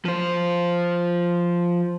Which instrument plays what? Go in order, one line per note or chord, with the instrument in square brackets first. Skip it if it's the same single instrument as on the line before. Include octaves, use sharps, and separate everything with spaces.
[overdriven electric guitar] F3 C5